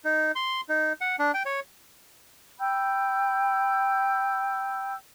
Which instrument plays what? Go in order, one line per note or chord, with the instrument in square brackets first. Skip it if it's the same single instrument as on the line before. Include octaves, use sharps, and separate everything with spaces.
[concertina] D#4
C6
D#4
F#5
D4
G5
C#5
[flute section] G5 B5 E6 G6